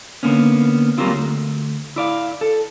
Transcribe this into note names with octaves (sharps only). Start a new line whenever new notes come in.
D3 A#3 B3 C#4
F#3 G3 A#3 C4 F4
D2
E4 D5 F5
A4